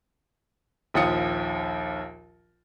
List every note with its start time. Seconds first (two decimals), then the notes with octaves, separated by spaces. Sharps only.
0.94 A#1 D#2 F3 G5 D#6 C#7